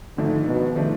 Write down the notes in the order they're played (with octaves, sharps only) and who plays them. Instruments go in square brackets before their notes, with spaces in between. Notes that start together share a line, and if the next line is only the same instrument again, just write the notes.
[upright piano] G#1 G#2 F3 A3 D4 [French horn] D3
[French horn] B2
[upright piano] F3 A3 D4